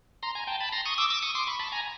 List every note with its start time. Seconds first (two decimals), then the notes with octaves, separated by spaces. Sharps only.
0.23 A#5 C6
0.35 G#5 A#5
0.47 G5 A5
0.60 A5 B5
0.72 A#5 C6
0.86 C#6 D#6
0.98 D6 E6
1.10 D6 E6
1.22 C#6 D#6
1.35 C6 D6
1.47 B5 C#6
1.59 A5 B5
1.72 G#5 A#5